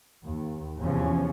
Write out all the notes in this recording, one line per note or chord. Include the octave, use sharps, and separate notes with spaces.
D#2
E2 C3 E3 F3 C#4